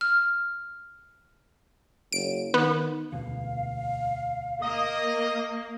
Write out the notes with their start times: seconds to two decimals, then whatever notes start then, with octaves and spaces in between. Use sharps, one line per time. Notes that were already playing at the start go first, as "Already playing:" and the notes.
0.01 F6
2.12 F#1 D7
2.54 D#3 B3
3.12 E1 D2 B2 F5
4.62 A#3 D#5